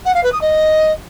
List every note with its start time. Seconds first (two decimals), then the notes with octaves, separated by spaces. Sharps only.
0.05 F#5
0.14 F5
0.23 B4
0.32 D#6
0.41 D#5